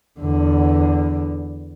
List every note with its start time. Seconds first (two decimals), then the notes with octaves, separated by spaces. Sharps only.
0.20 E2 D3